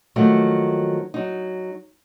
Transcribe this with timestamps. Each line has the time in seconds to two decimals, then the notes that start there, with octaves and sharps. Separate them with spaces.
0.16 D#3 F3 F#3 A3 A#3
1.14 F#3 D#4